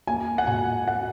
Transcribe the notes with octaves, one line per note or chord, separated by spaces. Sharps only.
A#3 G#5
F#5
A#2 G#5
F#5